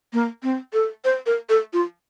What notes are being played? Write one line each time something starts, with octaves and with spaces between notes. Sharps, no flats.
A#3
C4
A4
C5
A#4
A4
F4